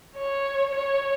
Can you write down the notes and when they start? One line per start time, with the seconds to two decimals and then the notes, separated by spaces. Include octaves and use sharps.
0.16 C#5
0.75 C#5